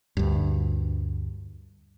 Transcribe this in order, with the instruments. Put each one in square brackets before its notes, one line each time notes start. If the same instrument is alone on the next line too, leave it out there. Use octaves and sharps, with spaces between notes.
[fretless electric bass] D2 G2